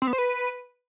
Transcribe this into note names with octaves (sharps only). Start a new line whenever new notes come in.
C4
B3
C5
B4